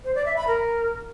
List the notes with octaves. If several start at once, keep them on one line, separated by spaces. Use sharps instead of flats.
C5
D5
E5
B5
A#4